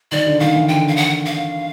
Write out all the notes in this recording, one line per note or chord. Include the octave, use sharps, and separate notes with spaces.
D#3 D5
D3
D#3 F5
E3
D3 G5
F5
F#5
F5